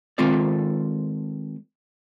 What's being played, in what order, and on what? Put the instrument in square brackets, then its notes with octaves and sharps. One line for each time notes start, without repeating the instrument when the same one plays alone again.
[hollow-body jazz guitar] D#3 G#3 C4 F4 A4 D5